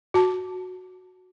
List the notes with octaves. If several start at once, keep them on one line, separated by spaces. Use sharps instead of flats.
F#4 A5